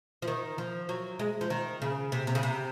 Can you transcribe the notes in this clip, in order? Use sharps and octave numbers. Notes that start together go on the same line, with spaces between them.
F3
D#3
F3
F#3
G#3
F3
D#3
C#3
C3
C3
C#3
C3